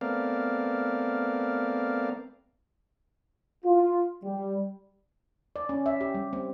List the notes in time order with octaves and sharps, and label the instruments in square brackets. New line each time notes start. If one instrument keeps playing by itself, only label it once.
[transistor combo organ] A3 B3 C4 A#4 D5 F5
[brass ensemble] F4
G3
[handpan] D5
C#4
E5
G4
G3
C4